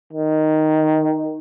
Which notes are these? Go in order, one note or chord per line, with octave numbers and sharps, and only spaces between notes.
D#3